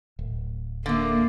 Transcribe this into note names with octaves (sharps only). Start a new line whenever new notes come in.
D1
D3 A3 A#3